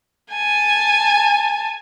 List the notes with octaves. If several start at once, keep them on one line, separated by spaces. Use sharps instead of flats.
G#5 A5